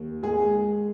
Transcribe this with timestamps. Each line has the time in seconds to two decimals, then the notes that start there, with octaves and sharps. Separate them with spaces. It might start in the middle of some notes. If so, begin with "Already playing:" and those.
Already playing: D#2
0.23 G#3 G#4